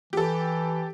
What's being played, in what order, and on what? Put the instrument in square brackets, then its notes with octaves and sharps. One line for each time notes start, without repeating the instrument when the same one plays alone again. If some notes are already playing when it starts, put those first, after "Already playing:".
[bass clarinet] E3 [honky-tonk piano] G4 A4